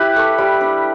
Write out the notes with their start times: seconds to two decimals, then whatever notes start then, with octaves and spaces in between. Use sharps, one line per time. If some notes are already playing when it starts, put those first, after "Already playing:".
Already playing: E4 G4 B4
0.16 A3
0.38 G3
0.61 D4